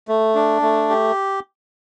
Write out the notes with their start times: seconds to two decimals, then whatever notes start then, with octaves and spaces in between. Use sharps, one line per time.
0.08 A3
0.35 D4
0.62 A3
0.90 G4